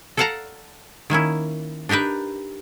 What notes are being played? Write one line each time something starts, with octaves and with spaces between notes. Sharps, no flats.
A4 D5 F5 F#5 A5 A#5
D#3 A#3 C#4 E4
D4 D#4 G4 A#4 B4